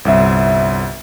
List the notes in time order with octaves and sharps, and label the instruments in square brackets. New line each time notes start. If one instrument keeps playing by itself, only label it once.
[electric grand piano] G1 C2 E5